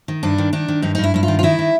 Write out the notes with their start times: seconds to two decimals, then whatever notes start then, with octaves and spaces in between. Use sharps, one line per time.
0.08 D#3
0.23 G2 D4
0.38 D#3
0.53 D#3 D4
0.68 D#3
0.82 G2 D#4
0.95 G2 D#4
1.04 E4
1.14 G2 E4
1.23 F4
1.28 D#3
1.39 F4
1.43 D#3 E4
1.59 D#3